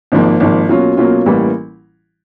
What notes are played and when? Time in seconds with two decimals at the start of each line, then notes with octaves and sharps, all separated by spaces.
0.12 G#1 G#2 F3 A#3
0.40 G#1 G#2 F3 A#3
0.69 B2 F#3 A#3 C#4 F4
0.97 B2 F#3 A#3 C#4 F4
1.26 A1 E3 G3 A#3